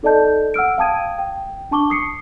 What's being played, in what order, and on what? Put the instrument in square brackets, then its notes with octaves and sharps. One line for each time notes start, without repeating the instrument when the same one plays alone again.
[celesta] D#4 A4 D5 D#5 A5 G6
F#5 E6 F6 D7
F5 G5 A5 D#6 G#6 D#7
G5
D4 A5 C#6 D6 G7
D#6 C7 C#7